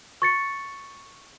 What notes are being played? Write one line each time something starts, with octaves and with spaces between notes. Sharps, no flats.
C#6 A6 C#7